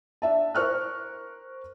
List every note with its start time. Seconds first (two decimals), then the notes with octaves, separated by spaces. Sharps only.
0.22 D4 E5 A5
0.55 A#4 C5 C#6 F6 F#6